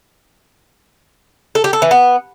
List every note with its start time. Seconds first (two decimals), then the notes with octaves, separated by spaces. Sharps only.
1.55 A4
1.64 G4
1.73 A4
1.82 E3
1.91 B3